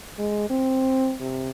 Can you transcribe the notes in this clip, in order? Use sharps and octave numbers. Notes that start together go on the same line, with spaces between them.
G#3
C4
C3